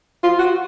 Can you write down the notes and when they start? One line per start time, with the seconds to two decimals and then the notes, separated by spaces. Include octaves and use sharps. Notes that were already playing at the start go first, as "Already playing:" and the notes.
0.24 F4
0.39 F#4